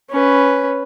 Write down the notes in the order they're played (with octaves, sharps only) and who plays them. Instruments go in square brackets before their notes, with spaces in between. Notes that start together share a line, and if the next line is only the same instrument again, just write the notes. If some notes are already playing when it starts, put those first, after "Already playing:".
[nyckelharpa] C#4 B4